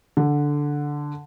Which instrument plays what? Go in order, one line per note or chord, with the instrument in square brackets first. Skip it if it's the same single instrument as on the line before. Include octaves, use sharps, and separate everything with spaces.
[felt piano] D3